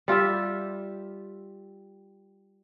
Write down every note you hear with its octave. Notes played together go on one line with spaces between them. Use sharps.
G3 F4 G4 E5